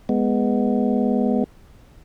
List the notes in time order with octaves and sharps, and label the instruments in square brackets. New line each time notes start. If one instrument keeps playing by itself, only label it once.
[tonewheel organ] G#3 B3